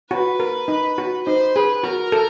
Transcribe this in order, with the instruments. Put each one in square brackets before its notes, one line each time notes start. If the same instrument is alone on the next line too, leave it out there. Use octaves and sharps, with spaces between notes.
[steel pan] F#4 [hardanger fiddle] B4
[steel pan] A#4
D#4
F#4
[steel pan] D#4 [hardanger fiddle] C5
[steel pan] G#4 [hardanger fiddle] B4
[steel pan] F#4 [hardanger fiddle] A#4
[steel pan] A4